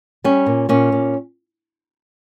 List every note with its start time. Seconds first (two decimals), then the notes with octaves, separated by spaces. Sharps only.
0.24 G3 C#4
0.46 A#2
0.69 A#2 C#4
0.92 A#2